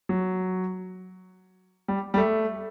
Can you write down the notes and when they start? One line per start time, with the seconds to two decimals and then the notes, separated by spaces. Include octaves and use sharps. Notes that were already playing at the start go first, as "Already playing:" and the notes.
0.09 F#3
1.88 G3
2.14 G3
2.17 A3